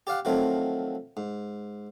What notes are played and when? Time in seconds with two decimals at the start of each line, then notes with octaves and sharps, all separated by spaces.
0.07 G4 D5 F5 F#5
0.25 D#3 F3 F#3 A3 C4
1.17 G#2